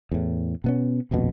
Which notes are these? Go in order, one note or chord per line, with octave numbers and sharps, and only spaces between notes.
E2 A2
B2 B3 C#4
D#1 A#1 F2 B2